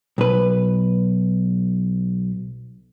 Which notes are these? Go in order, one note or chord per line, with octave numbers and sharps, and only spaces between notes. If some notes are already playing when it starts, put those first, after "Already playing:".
B1 B4